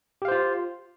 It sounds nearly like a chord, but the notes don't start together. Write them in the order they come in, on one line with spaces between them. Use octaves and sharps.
G4 F5 C5 F4